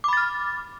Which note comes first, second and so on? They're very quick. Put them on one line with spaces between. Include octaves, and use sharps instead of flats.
D6 B5 A6 F6